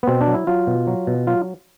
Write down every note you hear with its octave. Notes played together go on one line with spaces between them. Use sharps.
B3
B2 C4
D4
F#3
E4
F#3 F4
B2
F#3
B2
F#3 F4